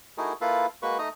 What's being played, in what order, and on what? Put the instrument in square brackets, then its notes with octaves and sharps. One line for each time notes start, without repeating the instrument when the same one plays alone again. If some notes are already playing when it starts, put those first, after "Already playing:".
[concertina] A3 D#4 E4 F#4 G#4 A#4
A#3 E4 F4 A4 B4 F5
G#3 A#3 F#4 B4 C#6
A3 D#4 D#5 A#5